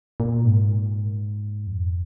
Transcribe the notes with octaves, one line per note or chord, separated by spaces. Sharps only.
A#2
G#2
F2